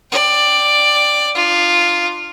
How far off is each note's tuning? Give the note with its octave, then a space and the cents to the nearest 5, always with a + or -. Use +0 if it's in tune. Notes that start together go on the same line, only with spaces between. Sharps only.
D5 +10 G5 +0
D4 +40 F4 +0